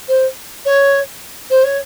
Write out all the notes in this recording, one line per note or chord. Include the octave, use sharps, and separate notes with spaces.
C5
C#5
C5
C#5